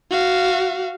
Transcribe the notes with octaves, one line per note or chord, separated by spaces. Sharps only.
F#4 F5